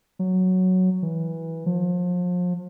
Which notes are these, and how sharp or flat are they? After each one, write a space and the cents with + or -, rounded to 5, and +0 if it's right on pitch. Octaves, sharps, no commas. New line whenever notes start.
F#3 +0
E3 -15
F3 +35